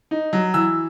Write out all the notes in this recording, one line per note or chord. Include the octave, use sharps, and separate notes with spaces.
D#4
F#3
E3 E6